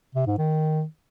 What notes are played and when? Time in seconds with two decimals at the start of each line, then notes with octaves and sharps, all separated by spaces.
0.15 C3
0.27 G#2
0.38 D#3